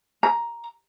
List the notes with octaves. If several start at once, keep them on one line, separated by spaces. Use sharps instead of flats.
A#5